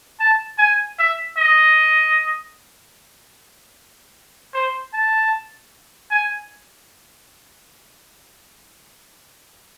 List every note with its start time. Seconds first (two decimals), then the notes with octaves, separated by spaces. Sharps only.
0.20 A5
0.58 G#5
0.99 E5
1.38 D#5
4.54 C5
4.93 A5
6.11 G#5